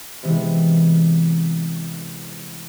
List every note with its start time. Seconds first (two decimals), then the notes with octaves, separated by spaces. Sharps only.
0.23 C3 E3 G#3 B3